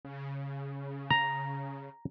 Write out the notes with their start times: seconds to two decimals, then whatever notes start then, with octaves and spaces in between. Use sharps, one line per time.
0.05 C#3
1.10 A#5